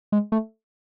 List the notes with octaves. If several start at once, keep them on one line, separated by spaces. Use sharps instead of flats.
G#3
A3